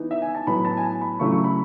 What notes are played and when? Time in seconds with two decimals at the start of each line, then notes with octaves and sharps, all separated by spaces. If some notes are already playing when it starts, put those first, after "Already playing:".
Already playing: E3 B3 D#4
0.11 E5
0.22 G#5
0.35 A5
0.47 A2 F#3 B3 B5
0.65 A5
0.77 G#5
0.83 A5
1.01 B5
1.20 C#3 F#3 A3 E4 C#6
1.32 C#6
1.44 B5